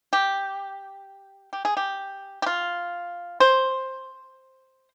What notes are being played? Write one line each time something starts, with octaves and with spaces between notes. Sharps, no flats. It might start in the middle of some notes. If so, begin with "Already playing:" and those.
G4
G4
G#4
G4
G4
F4
C5